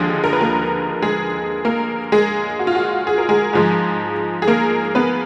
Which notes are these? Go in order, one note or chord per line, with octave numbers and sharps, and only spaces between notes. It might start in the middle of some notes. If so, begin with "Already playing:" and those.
Already playing: D#2 D3 F3 G#3 G#4
A#4
B4
A#3 A#4
G#3 G#4
A#3 A#4
G#3 G#4
F#4
F4
F#4
G#4
A#4
G#3 G#4
G#2 F3 G#3
G#4
A#3 A#4
B3 B4